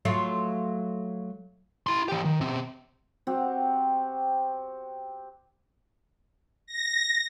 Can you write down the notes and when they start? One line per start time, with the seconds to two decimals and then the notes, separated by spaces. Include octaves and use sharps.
0.05 F#3 A3 F4
1.87 E4 C6
2.08 E3 G4
2.25 D#3
2.41 B2 C4
3.27 C4 F#4 G4
6.66 A#6